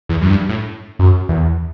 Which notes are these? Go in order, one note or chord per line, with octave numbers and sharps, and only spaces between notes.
E2
F#2
G2
A2
F#2
E2